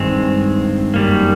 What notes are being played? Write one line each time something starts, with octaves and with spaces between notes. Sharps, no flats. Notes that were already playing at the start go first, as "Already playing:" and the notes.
Already playing: G2 D#3 G#3 C4
F#2 D#3 G3 A#3